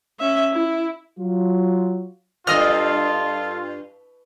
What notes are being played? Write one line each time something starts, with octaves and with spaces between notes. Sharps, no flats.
C#4 E5
E4
F#3 F4
E2 G2 F4 A4 D#5 F6